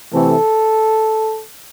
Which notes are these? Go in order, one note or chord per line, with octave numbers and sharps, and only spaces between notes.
C3 E3 A3 C4 A4